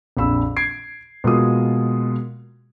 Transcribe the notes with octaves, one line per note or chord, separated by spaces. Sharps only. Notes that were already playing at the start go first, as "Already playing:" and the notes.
A#1 F2 D4 B5 E6
G#6 C7 D7
B2 G#3 A#3 F4 D#6